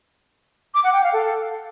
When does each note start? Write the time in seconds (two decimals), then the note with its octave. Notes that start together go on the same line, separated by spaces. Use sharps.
0.73 D6
0.83 F#5
0.93 G5
1.02 F5
1.12 A4